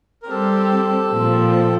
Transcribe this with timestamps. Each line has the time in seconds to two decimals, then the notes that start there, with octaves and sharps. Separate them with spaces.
0.23 A#4
0.29 G3 C4 G4 A4 C5
1.10 A#2 F3 C4